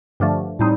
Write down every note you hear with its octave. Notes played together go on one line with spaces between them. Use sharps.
G2 D3 F3 A3
A2 G3 C4 D#4